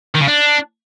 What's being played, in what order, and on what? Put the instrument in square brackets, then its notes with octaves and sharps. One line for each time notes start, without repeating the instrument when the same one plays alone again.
[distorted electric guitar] D#3
C#3
D4